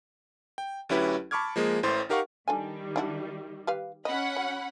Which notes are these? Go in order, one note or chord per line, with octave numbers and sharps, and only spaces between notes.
G5
D2 F#3 C#4 E4 G4 B4
A5 B5 C#6 D6 F6 G#6
F3 G#3 A#3 G#4
A1 A2 E3 C5 C6 A6
D#4 G4 A#4 F5 F#5 C#6
D#3 G3 D4 A4 G#5
D4 E4 F#4
G4 B4 F5
C#4 D#5 F#5 B5
F#3